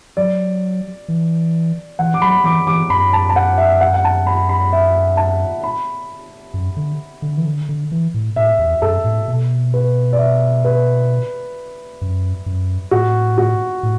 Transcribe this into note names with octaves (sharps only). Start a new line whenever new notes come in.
F#3 D5
E3
E3 F#5
D6
F#3 B5
E3 D6
E3 D6
F#2 B5
A5
A5
F#5
E5
F#5
F#5
A5
B5
B5
E5
A5
B5
F#2
D3
D3
E3
D3
D3
E3
A2
A2 E5
E2
F#2 A4
A2
B2
B4
D5
E5
B4
F#2
F#2
A2 F#4
F#4
A2